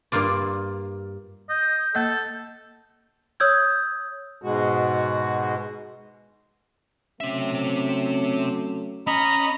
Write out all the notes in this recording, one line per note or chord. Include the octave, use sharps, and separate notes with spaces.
G2 A#3 F4 D5
D#5 G6
A#3 A4 D#5
C#5 D#6 E6 G6 G#6
G#2 B2 G#3 F#4
F#3 A3 C4 C#4 E5
C#4 D#5 A#5 B5